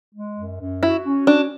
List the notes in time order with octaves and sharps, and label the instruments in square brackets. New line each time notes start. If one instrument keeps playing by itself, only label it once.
[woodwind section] G#3
F#2
F#2
[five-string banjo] E4 [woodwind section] F#4
[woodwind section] C#4
[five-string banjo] D4 [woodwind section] F#4